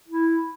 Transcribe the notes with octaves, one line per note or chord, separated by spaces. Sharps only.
E4